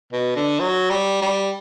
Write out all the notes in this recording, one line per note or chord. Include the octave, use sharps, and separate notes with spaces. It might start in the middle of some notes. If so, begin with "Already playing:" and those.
B2
D3
F#3
G3
G3